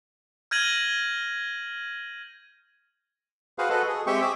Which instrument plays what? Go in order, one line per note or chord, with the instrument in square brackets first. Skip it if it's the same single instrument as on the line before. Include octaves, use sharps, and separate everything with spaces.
[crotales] F6 G6 G#6 A#6 D#7 F#7
[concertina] F#4 G#4 B4 C5 F5
F#4 A4 B4 D#5
G#4
G#3 C4 G4 E5 G5 C#6
G#4 D6 E6